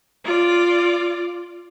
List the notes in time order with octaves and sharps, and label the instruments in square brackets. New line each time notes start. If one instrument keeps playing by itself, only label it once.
[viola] F4 D5